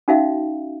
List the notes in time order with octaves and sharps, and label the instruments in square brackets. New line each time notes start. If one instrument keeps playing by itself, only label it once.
[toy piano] C#4 D#4 F#4 E5 F5